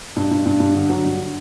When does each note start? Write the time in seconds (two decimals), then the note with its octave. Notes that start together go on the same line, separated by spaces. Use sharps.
0.16 G2
0.31 G2
0.46 G2
0.60 G2
0.75 D3
0.90 F#3
1.05 G2